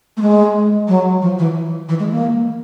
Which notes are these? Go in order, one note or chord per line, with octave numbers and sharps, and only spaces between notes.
A3
G#3
F#3
F3
E3
E3
G#3
A#3